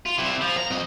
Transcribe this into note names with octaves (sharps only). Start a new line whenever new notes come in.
F4
C3 E4
F3
C2 A#5
F2 D#5